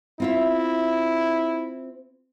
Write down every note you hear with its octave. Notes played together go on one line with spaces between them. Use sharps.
C4 E4 F4 E5